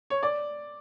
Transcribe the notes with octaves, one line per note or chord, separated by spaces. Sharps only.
C#5
D5